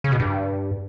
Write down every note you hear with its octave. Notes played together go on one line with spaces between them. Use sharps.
C#3
B2
G2